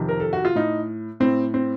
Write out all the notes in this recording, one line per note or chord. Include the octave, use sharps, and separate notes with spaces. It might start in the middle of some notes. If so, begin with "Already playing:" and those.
Already playing: F2 C3 D#3
A#4
A4
F#4
F4
A2 D#4
A2 C4
C4